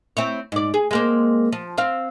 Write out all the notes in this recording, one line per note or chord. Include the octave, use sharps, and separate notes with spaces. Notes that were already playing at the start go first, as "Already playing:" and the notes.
C4 E4 C#5
G#2 D5
G#4
G#3 A#3 C4
F3
C4 C5 F5